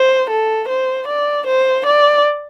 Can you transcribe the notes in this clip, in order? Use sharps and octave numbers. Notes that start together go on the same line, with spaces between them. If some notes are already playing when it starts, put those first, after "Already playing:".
Already playing: C5
A4
C5
D5
C5
D5